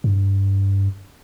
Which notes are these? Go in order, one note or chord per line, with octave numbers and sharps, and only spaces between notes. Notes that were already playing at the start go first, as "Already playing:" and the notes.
G2